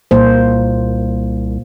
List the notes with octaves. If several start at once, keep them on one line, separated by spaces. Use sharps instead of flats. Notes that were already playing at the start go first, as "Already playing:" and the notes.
C2 A#2 A#3 C5